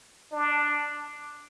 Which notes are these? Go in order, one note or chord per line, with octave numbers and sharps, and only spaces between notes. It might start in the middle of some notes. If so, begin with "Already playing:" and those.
D4